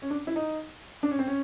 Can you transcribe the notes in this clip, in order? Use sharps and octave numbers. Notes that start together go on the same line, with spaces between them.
C#4
D4
E4
D#4
D4
C#4
C4
C#4